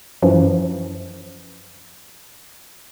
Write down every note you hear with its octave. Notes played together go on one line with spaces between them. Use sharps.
F#2 E3 F3